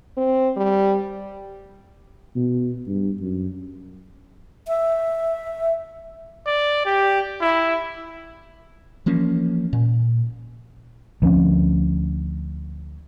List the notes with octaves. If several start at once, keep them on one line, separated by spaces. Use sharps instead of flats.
C4
G3
B2
G2
F#2
E5
D5
G4
E4
E3 F3 A#3 C#4
A#2
D2 F3 C4 C#4